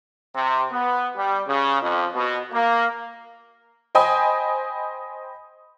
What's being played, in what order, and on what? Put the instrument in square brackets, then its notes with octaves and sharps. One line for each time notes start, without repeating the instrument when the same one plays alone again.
[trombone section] C3
B3
G3
C#3
F2
B2
A#3
[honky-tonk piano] C5 D#5 G5 G#5 B5 D#6